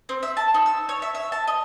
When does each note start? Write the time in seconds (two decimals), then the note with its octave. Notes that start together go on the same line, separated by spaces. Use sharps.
0.09 C4
0.23 E5
0.37 A5
0.54 D#4
0.66 E6
0.89 C#5
1.02 E5
1.15 E5
1.32 A5
1.47 D#5